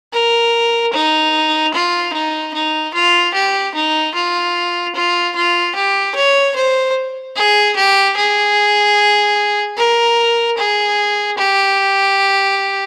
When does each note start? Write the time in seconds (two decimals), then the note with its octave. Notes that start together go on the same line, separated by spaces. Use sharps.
0.13 A#4
0.93 D#4
1.74 F4
2.13 D#4
2.54 D#4
2.94 F4
3.34 G4
3.75 D#4
4.15 F4
4.95 F4
5.36 F4
5.75 G4
6.15 C#5
6.56 C5
7.36 G#4
7.76 G4
8.17 G#4
9.77 A#4
10.58 G#4
11.38 G4